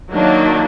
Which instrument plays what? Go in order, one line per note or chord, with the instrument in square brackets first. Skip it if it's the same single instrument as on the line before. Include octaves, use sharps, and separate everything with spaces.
[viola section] D#3 F#3 A#3 D4